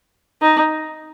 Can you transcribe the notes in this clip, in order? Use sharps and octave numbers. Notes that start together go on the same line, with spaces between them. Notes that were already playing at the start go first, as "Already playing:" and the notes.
D#4